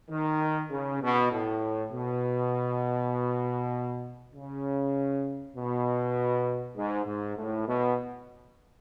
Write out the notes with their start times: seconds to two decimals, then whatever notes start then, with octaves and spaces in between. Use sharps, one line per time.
0.10 D#3
0.71 C#3
1.02 B2
1.31 A2
1.92 B2
4.34 C#3
5.56 B2
6.76 G#2
7.06 G#2
7.37 A2
7.67 B2